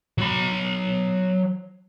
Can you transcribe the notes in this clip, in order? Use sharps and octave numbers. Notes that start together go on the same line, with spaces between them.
F#3 B5